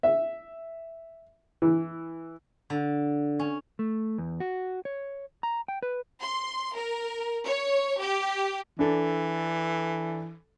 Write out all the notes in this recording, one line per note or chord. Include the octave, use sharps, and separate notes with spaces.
E5
E3
D3
C#4
A3
E2
F#4
C#5
A#5
G5
B4
C6
A#4
C#5
G4
E3 D4 A4